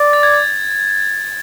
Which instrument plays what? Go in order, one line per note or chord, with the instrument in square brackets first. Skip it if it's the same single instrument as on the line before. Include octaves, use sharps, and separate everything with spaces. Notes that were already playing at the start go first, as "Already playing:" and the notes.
Already playing: [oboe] D5
[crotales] A6
G#6
A6